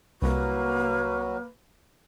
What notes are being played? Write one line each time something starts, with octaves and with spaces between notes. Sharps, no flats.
C2 F#3 A#3 F#4 B4